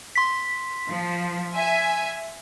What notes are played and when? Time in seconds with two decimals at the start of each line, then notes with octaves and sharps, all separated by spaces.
0.15 C6 B6
0.87 F3
1.53 E5 G#5